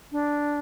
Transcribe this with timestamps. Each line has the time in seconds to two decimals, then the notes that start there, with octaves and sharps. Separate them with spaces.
0.12 D4